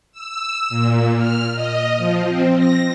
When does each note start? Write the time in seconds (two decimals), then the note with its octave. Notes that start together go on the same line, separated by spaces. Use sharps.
0.12 E6
0.69 A#2
1.17 F6
1.54 D#5
1.97 F3
2.28 C4
2.57 A#6